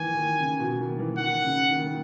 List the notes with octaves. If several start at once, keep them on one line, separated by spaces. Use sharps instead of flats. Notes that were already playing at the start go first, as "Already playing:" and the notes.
Already playing: D#3 E3 G#5
D#3
C#3
B2
D#3
E3
D#3 F#5
C#3
D#3
D#3